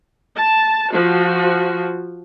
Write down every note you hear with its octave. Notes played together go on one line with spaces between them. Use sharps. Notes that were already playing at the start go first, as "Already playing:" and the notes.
A5
F3 F#4